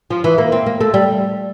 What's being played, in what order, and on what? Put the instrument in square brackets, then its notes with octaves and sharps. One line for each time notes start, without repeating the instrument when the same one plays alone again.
[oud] F3
E3
A#3
C4
A#3
A3
G3